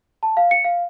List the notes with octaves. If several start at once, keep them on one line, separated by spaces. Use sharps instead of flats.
A5
F5
C#7
F5